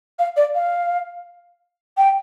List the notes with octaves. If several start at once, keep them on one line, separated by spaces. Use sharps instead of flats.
F5
D5
F5
G5